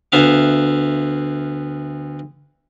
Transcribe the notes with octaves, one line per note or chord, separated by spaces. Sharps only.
D2 B3 E5 F5